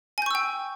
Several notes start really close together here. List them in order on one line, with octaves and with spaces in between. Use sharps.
G#5 G6 C#6 E6 G5